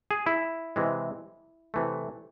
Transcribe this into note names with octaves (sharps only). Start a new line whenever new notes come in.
G#4
E4
C3 E3 G#3
C3 E3 A3